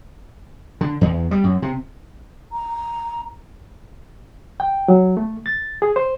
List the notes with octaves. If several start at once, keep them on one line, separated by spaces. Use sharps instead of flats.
D3
E2
G3
F#2
C3
A#5
G5
F#3
A3
A6
G#4
C5